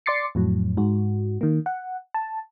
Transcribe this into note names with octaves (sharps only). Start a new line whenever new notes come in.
D5 C6 D6 A6 C7 C#7
F2 A2 F#3
G#2 F#4
D#3 A#3
F#5
A5